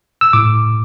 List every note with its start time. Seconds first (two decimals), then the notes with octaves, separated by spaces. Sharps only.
0.21 E6
0.33 A2 D6